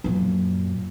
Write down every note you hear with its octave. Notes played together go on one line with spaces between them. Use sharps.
F#2 A#2